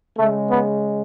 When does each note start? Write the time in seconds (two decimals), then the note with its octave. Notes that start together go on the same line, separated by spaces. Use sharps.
0.18 C#3 G#3 A3
0.50 B3